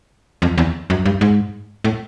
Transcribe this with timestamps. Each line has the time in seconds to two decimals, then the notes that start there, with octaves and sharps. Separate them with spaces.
0.42 F2
0.58 E2
0.90 F#2
1.06 G2
1.21 G#2
1.84 A2